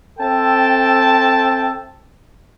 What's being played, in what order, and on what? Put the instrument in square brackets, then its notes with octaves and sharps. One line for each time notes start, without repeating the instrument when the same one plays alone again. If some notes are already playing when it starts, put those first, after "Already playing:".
[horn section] C4 A4 E5 G5 A5